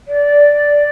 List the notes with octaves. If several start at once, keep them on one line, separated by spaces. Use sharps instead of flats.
D5